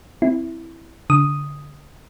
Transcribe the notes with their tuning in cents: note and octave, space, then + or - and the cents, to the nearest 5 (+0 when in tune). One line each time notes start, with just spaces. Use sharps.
C4 +0 E4 +0
D3 -25 D#6 +0